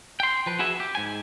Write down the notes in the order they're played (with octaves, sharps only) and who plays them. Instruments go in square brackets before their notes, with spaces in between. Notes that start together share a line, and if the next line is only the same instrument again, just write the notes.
[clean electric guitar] G5 C6
F3 B4
F#4 G#4 B4 E5 G#5
G4
G#2 G#5